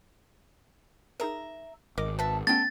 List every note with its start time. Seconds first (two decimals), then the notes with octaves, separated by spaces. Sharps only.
1.20 D#4 G#4 A#4 E5 A#5
1.98 G#1 A#4 D#5 D6
2.19 B4 E5 A5 A6
2.47 A3 B3 C#4 A4 G5 A6